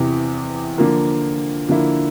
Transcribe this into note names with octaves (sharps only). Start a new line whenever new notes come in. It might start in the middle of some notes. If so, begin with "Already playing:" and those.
Already playing: E2 C3 E3
D3 F3 A#3
D3 F3 A#3 E4